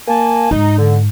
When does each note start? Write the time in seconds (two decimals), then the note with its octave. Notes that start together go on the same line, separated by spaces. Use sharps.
0.08 A#3 G#5 A5
0.51 G#2 D#4
0.78 D3